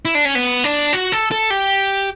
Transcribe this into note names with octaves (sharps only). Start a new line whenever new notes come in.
E4
D4
C#4
B3
D4
F#4
A4
A4
G4